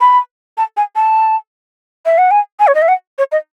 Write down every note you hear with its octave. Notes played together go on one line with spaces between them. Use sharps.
B5
A5
G#5
A5
E5
F#5
G#5
G#5
C#5
D#5
E5
F#5
C#5
D#5